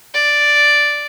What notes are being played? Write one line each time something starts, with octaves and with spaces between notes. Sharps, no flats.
D5